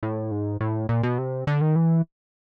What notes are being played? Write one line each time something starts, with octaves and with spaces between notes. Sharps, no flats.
A2
G#2
A2
A#2
B2
C3
D3
D#3
E3